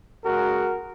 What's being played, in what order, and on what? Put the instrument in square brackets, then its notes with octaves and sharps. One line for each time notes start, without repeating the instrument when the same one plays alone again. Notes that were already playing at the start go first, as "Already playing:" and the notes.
[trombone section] C#3 G#3 F#4 A#4